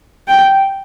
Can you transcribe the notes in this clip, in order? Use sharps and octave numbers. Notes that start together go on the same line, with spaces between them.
G5